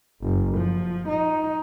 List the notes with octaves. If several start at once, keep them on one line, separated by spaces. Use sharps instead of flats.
F#1
F3
D#4